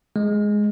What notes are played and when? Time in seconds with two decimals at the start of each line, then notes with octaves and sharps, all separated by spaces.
0.16 G#3